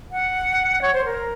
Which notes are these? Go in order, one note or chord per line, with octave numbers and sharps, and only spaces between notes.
F#5
C#5
C5
A#4